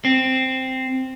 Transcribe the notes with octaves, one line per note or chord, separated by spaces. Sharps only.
C4